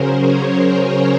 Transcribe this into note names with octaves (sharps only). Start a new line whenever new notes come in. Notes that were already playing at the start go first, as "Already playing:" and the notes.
Already playing: C#3 F#3 C#4 G#4 A#4 C5
C#5
A#4
G#4